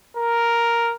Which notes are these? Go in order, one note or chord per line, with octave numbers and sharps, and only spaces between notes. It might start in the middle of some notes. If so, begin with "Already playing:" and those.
A#4